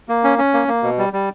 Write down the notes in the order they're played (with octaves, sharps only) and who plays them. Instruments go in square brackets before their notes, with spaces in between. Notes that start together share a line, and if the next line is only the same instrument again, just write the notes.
[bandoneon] A#3
C#4
C#4
A#3
A#3
B2
G3
G3